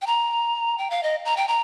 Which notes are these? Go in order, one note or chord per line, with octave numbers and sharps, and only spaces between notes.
G5
A#5
G5
F5
D#5
A#5
G5
A#5